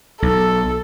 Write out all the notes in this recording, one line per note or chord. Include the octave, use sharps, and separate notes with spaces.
B1 A4